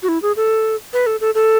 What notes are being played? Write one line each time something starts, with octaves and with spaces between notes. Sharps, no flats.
F#4
E4
G#4
A4
B4
A4
A4
A4